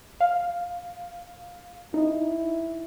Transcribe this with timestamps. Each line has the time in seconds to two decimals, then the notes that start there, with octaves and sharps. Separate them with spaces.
0.21 F5
1.94 D#4 E4